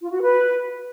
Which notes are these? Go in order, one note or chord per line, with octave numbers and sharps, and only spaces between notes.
F4
F#4
B4